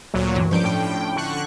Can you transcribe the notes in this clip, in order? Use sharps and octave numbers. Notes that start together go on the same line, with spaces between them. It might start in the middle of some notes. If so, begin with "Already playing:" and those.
D2 A#2 F#3
G2 D3 E3
G2 F3 C#4 D4 G6 D7
A2 G5
D3 C#6 F#6